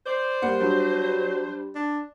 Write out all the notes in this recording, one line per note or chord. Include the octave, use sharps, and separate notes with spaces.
C5 D5
G3 A#3 F#5
F#3 G3 D4
D4